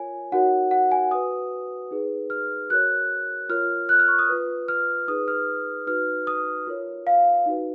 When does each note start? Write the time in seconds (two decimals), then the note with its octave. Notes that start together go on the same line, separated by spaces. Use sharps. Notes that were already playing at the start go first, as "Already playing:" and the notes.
Already playing: F4 A#4 C#5 G#5
0.32 D#4 F#4 A#4 C#5 F#5
0.71 F#5
0.92 G#5
1.11 F#4 B4 D#6
1.91 D#4 G#4 B4
2.30 F6
2.70 F#4 A#4 C#5 F#6
3.49 F4 A#4 C#5 F6
3.89 F#6
3.99 F6
4.08 C#6
4.19 D#6
4.29 F4 B4
4.68 F6
5.08 D#4 G#4 B4 D#6
5.28 F6
5.87 D#4 F#4 B4 F6
6.27 D#6
6.67 F4 A#4 C#5
7.07 F5
7.46 D#4 F#4 B4